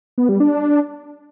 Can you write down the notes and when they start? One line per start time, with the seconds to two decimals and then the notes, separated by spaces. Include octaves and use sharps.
0.18 B3
0.29 G3
0.40 D4